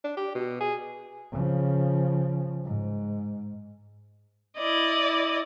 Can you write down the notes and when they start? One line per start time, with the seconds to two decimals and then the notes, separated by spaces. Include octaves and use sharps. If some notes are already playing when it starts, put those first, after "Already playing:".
0.04 D4
0.17 G4
0.35 B2
0.61 G#4
1.32 C#3 F3
2.65 G#2
4.58 E4 D5 D#5